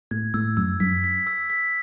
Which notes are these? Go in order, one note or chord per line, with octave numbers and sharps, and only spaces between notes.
A2 G#6
A2 E6
F#2 E6
F#2 B6
B6
E6
B6